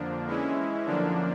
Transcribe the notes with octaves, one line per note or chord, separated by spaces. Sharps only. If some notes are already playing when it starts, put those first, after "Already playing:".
Already playing: F2 D3 F3 A#3 D4
E3 G#3 C#4 E4
F#2 D3 F3 A#3 D4